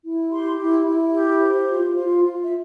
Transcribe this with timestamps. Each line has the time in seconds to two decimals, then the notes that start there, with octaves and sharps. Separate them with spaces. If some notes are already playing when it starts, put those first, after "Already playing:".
0.03 E4
0.31 G4 C6
0.59 E4
0.86 E4
1.13 G4
1.41 C5
1.69 F4
1.96 F4
2.24 F4
2.44 E5